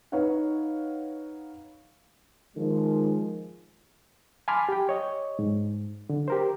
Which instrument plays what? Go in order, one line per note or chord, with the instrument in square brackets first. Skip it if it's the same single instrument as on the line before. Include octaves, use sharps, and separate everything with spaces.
[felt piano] D#4 B4 C#5 F5 F#5
[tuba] D#3 [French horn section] F3 G#3
[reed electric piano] G#5 A5 B5 C6 D6 F6
G4 G5
C#5 D#5
G#2
D3
G4 A#4 C5